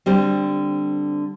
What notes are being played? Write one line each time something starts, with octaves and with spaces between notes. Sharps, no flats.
D3 G3 C4